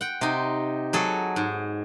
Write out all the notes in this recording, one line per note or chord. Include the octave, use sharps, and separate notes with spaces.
F#5 G5
C3 D#4
F#3 G#4 A4
G#2